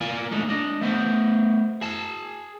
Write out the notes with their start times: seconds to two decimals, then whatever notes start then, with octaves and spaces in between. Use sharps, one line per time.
0.01 A#3 F4 D5 G#5
0.32 G#3 A3 D4 D#4
0.49 D4 D#5
0.81 A3 B3 C5
1.81 G#4 A5